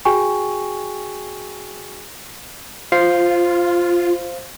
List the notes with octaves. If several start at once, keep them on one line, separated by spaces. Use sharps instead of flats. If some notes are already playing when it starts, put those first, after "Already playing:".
F#4 G#4 G5 G#5 C#6
F4 C5 F5 C7